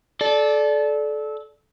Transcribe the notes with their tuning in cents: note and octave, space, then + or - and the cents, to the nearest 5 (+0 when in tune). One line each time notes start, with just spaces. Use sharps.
A4 -25 D5 +0